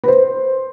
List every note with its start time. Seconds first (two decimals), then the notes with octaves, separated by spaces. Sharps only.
0.04 B4
0.08 C5